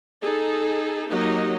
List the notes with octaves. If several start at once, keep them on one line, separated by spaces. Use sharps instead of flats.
D#4 G#4 A4
F#3 A#3 D#4 G4 D#5